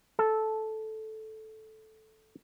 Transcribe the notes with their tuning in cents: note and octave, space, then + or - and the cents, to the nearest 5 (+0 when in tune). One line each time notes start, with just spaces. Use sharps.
A4 -10